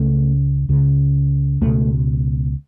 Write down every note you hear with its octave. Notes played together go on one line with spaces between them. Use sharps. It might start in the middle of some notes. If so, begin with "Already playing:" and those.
Already playing: C#2 C#3 A3
C#2 C#3
C#2 B2 A3